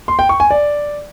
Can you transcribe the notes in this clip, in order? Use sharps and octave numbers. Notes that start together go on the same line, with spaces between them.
C6
G5
C#6
G#5
D5